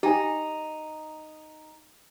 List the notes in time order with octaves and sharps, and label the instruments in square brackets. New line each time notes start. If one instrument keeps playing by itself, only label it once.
[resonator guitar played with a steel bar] D#4 [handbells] G4 G#5